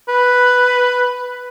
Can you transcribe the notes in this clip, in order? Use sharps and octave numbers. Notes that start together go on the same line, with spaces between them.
B4